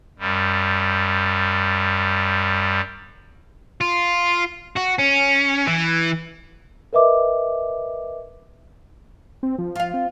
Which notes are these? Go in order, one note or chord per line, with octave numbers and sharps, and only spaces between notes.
F#2 G3
F4
F#4
C#4
E3
A#4 B4 D#5 E5 D6
C4
F3
F4 F5
C4